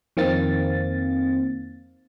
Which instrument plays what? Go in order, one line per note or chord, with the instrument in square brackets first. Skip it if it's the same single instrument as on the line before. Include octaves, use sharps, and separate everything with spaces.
[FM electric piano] F2 D#3 A#3 C4 F5 A6